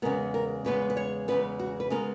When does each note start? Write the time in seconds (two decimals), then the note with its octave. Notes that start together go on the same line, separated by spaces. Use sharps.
0.02 E2 C#3 G#3 B3 A#4
0.34 A#4
0.65 E2 C#3 G#3 B3 B4
0.90 B4
0.97 C#5
1.28 E2 C#3 G#3 B3 B4
1.59 F#4
1.80 B4
1.90 C#3 G#3 B3 A#4